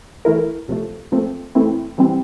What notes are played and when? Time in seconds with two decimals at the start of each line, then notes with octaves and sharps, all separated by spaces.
0.25 E3 A3 E4 A#4
0.68 D2 C3 F3 A3
1.12 A#2 F3 A3 C4
1.55 E2 E3 A3 C4 E4
1.98 C3 E3 G3 C4